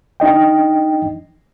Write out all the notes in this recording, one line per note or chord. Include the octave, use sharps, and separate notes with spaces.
D4 D#4 D#5 G5